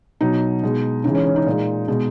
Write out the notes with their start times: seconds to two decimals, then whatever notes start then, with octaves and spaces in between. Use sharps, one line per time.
0.21 B2 F#3 D#4
0.63 B2 G#3
1.04 C#3 E3 G#3 D#4
1.15 C#4
1.26 C#4
1.36 D#4
1.47 A#2 G#3
1.88 B2 G#3